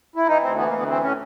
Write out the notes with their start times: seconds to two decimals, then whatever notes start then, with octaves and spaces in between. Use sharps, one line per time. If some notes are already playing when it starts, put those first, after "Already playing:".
0.16 E4
0.27 E3 D#4
0.42 D2 C4
0.57 E3 B3
0.67 A#3
0.72 D2 B3
0.88 E3 C4
1.02 A2 C#4